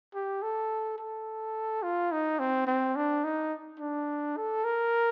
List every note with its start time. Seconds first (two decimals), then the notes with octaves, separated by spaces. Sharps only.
0.14 G4
0.43 A4
0.98 A4
1.83 F4
2.12 D#4
2.39 C4
2.67 C4
2.96 D4
3.24 D#4
3.80 D4
4.37 A4
4.64 A#4